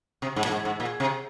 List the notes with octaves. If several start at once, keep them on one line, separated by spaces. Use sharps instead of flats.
C3
G#2
A#2
G#2
G#2
A#2
C3